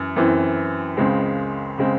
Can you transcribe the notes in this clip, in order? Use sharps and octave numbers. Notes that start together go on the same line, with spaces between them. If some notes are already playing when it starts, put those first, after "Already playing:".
Already playing: F#2 E3
F#2 E3 C4
C#2 C#3 G#3 C4
C#3 G#3 C4